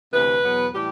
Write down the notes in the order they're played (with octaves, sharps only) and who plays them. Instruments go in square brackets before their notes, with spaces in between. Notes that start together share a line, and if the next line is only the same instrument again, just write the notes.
[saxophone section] D2 C3 E3 B4
E2 B2 F#3 B3
A2 E3 G3 G4